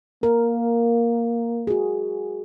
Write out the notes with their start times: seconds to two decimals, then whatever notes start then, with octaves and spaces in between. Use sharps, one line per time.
0.23 A#3 A#4
1.67 F#4 G#4